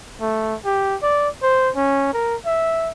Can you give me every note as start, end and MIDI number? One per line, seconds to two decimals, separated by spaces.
0.21 0.55 57
0.65 0.96 67
1.02 1.29 74
1.43 1.70 72
1.76 2.12 61
2.13 2.36 70
2.46 2.91 76